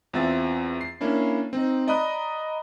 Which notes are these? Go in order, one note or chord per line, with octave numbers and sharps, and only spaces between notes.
E2 C4 F4 E5 A6
C7
A#3 C#4 D4 E4
C4 D#4
D5 D#5 A#5 B5 D#6 F#6